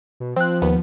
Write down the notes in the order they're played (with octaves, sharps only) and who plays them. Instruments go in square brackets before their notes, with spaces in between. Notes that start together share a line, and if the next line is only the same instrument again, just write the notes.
[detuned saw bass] B2
[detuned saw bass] F3 [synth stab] C4 F#6
[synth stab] D#2 B3